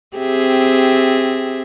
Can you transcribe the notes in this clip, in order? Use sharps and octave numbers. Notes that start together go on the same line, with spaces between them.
C4 G4 G#4 E5